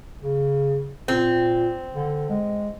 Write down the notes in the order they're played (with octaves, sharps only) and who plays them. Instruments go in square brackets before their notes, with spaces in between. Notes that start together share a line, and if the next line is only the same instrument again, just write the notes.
[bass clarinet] C#3
[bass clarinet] A#2 [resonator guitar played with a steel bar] C4
[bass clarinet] D3
G#3